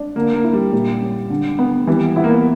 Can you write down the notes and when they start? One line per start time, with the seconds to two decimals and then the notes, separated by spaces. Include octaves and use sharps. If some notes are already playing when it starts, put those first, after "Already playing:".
Already playing: D4
0.16 D3 A#3
0.34 A#3
0.44 E4
0.53 G3
0.73 A#2 G3
1.01 C#4
1.30 D3
1.59 B3
1.87 E3 G3
2.16 B3 E4
2.24 A#3
2.30 B3